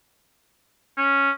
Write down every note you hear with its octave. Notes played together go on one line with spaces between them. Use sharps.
C#4